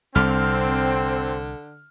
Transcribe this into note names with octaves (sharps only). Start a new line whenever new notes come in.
C2 D3 C4 F6